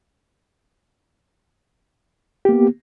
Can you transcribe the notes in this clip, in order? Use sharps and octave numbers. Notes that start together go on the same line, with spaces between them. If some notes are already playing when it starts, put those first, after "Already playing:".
A#3 B3 G4